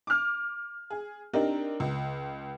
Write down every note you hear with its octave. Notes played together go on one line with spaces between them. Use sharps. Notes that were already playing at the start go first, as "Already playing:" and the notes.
D6 F6
G#4
C4 D4 D#4 G4 A#4
C#2